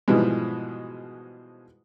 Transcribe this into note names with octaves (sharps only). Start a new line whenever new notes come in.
G#2 B2 E3 F3 G3 G#3